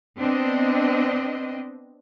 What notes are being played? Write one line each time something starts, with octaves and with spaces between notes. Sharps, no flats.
B3 C4 D4 D#5